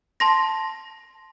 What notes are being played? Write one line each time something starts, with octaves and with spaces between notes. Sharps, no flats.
A5 C6 A#6